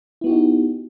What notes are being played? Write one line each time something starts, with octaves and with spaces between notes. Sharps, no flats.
B3 D#4 E4 F#4 G4